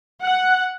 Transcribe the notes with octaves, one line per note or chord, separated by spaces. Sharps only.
F#5